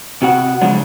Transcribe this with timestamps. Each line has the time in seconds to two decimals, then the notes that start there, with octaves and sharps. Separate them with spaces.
0.22 C3 F#4 F#5
0.61 C#3 F3 F#3 G#3 D4